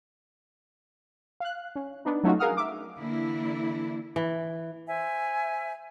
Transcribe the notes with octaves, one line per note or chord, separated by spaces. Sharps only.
F5 F#6
C#4
B3 D4 D#4
F#3 A3 C#4 D#4 F4 F#4
G#4 A#4 F5 F#5 D#6 F6
E5 D6
D3 E3 A#3 D4 E4
E3
C5 E5 G#5